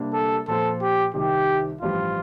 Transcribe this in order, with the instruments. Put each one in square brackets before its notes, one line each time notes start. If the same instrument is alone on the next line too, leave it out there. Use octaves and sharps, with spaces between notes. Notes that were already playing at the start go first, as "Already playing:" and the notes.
Already playing: [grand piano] C3 G3 A#3 D4
[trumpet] A4
[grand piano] A#2 F3 C4 F4 C5 [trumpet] A4
[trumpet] G4
[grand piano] C2 C3 D#3 [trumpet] G4
[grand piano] A1 G2 F3 C4 G4 [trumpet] F4